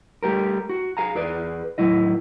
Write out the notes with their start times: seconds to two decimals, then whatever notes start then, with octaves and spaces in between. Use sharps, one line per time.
0.23 G3 A3 G4 A#4
0.69 F#4
0.97 G#4 F5 G#5 A#5
1.15 E2 G#4 B4 D5
1.78 D#2 A2 C#3 F#3 E4 D#5